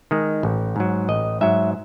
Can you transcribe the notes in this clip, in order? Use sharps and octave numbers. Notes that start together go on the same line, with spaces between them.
D#3 G#3
A1
G#2 F#3
A1 D#5
G#2 F#3 E5